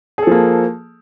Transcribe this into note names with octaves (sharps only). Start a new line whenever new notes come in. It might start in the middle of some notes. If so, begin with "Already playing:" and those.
F3 A#3 G#4 A4